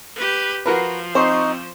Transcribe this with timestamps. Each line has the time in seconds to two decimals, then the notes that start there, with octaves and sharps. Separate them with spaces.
0.16 G4 B4
0.66 F3 F#4 A#4 B4
1.15 C4 D#4 C5 C#6